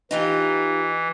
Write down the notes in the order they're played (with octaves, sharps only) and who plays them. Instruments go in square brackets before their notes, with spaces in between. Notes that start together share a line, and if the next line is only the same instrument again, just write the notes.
[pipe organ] E3 [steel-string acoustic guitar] D#4 F4 G4